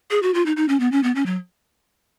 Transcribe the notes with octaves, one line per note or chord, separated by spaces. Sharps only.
G#4
F#4
F4
D#4
D#4
C#4
B3
C#4
B3
C#4
F#3